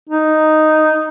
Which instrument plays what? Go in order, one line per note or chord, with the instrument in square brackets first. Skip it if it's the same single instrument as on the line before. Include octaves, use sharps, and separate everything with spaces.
[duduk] D#4